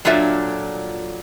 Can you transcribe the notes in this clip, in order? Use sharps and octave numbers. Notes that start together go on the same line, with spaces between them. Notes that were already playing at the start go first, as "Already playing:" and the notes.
A#2 F#3 D4 F4 A4 E5